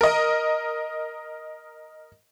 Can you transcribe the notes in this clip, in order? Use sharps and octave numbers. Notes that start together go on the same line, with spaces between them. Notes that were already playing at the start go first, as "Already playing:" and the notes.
A#4 D#5